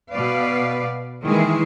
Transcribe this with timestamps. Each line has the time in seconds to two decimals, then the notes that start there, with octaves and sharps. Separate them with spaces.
0.10 B2 B4 D5 F5
1.23 D#3 E3 G#3 A#3 E4 G#4